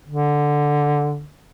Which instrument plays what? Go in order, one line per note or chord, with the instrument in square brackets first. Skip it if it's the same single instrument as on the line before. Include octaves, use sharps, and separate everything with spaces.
[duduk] D3